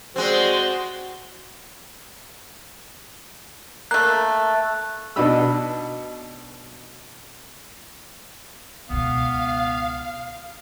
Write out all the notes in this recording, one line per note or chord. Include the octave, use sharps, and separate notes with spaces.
G#3 C4 F#4 C5 D5 C6
A3 A#3 F#6
B2 D4 D#4 D#5 B5 E6
C#2 B2 B3 F5